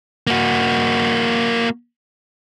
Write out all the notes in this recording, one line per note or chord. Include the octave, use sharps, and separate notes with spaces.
A#3 F#4